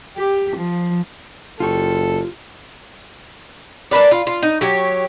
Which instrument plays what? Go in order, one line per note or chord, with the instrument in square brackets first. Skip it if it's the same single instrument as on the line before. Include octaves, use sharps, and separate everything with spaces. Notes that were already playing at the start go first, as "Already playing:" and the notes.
[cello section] G4
F3
[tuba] F#1 [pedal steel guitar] F4 G4 C#6 [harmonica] A4
[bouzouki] D4 A#4 B4 D5
F4
F4
D#4
F#3 G4 C#5